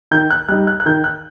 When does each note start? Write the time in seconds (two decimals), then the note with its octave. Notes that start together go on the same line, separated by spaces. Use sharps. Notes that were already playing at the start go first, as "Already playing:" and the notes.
0.11 D#3 G6
0.30 F#6
0.49 G3 D#4 F#6
0.67 F#6
0.80 F#6
0.86 D#3 G6
1.04 F#6